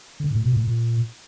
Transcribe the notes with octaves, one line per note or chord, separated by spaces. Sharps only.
D3
A2
B2
A2
A#2